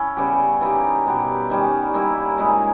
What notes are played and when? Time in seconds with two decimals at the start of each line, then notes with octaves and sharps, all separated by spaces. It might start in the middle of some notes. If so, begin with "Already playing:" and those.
Already playing: C#4 E4
0.17 C#3 G3 B3 G4
0.61 E3 A#3 D#4 G4
1.06 B2 G3 B3 G4
1.50 D#3 G3 C#4
1.94 G3 A#3 E4
2.38 A#2 G#3 D#4 G#4